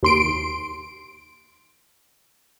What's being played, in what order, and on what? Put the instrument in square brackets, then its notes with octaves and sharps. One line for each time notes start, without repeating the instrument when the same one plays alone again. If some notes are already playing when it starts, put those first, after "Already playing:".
[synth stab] D#2 C6 D7